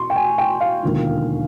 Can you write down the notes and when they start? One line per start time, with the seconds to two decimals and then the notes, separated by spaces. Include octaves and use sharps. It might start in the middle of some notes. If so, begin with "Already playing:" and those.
Already playing: E2 B2 C6 C#6
0.10 G5
0.16 G#5
0.38 G5
0.60 F5
0.83 E1 D#2 D3 F3